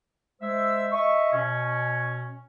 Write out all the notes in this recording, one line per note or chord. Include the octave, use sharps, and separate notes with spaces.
G#3 C5 E5 E6
D#5 E5 C#6
B2 C#4